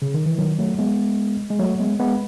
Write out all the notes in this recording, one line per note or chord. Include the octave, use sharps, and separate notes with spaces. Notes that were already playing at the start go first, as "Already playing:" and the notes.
C#3
D#3
E3
D#3 F#3
F#3 A3
G#3 B3
G#3
F#3 A3
G#3 B3
G#3 B3